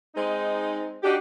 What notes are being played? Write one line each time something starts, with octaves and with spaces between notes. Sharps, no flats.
G#3 C4 D#4
D4 D#4 F#4 G4